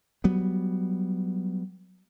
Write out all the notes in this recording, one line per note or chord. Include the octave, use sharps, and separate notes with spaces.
F#3 G3 B3